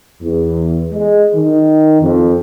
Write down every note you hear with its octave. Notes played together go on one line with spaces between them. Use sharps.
E2
G#3
D#3
F2